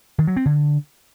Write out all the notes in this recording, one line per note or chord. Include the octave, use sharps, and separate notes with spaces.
D#3
F#3
C4
D3